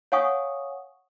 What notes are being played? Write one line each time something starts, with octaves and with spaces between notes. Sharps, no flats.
C#5 F5 F#5 G#5 C#6 D#6